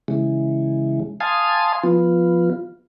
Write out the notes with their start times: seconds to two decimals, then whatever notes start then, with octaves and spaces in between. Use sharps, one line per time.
0.08 C#3 E3 G#3
1.20 F5 G#5 A5 C6 D#6
1.83 F3 B3 F4